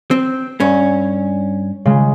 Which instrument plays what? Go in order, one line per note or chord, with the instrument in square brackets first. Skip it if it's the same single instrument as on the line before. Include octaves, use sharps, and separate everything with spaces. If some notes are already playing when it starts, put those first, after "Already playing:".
[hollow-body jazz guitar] C4
G2 C#4
[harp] C#3 G#3